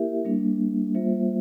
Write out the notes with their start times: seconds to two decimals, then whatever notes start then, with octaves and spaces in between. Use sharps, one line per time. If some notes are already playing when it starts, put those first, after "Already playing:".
Already playing: A#3 E4 G4 A#4 E5
0.25 G3 A#3 D4
0.94 G3 A#3 F4 C5 E5